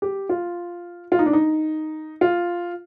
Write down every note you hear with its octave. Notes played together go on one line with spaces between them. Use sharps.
G4
F4
F4
D#4
D4
D#4
F4